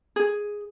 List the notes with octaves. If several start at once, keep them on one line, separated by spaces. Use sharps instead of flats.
G#4